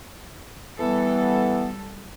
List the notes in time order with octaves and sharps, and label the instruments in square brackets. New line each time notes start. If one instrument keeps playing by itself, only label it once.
[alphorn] E3 [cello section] G3 A4 [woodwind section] B3